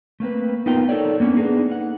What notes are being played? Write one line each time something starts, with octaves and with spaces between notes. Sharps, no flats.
A3 A#3 C4 B4
B3 D#4 F4 A#4 G5
D#4 A4 A#4 C#5 D5
A#3 B3 C#4 D4
A#3 B3 D4 D#4 G#4
F#5